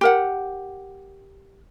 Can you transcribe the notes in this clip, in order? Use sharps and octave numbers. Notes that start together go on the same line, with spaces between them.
G4 A#4 F#5